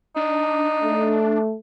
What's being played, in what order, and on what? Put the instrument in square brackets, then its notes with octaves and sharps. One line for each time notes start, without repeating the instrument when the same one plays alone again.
[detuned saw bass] D4 [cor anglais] D#4
[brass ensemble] A3